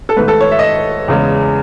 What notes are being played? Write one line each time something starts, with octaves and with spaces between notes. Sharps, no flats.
A4
G#2 D#3 A3 B4
A4
C#5
E5
D#5
E5
E2 C#3 G#3